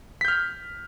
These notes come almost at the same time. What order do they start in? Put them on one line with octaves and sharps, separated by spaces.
B6 G6 F6